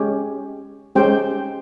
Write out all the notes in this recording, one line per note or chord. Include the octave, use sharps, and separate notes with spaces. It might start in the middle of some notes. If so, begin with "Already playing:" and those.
Already playing: G#3 C#4 G4
G#3 C#4 G4 C5 G5